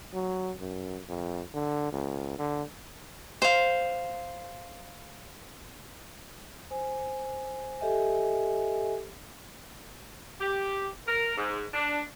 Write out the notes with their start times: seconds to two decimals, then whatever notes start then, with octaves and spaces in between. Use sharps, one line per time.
0.14 F#3
0.60 F#2
1.09 F2
1.54 D3
1.92 C#2
2.39 D3
3.42 C5 F5
6.71 C5 G#5
7.80 G4 A4 D#5 E5 G#5
10.40 G4
11.06 A#4
11.37 G#2
11.73 D4